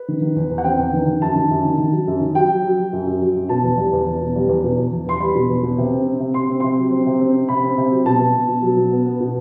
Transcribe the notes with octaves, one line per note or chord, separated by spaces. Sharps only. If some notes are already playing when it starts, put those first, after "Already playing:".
Already playing: B4
D#3
D#3
E2
E2
F#5
C4 G5
E2
D#3
D#3
F#2 A5
D#3
F#2
D#3
D#3
F#3
F#2
D#3
F#3 G5
F#3
F#3
F#3
F#2
F#2
F#3
F#2
B2 A5
E2
G3
E2
E2
B2
G3
E2
B2
E2
E2
E2 C6
G3 B5
B2
E2
B2
C3
C4
C4
C3
C3 C6
C4
C3 C6
F#3
C4
C3
C4
C4
C3 B5
C4
C3
F#3
B2 A5
B2
B2
B2
F#3
B2
B3
B3
B2